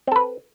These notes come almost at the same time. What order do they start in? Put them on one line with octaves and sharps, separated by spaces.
C4 A4 B4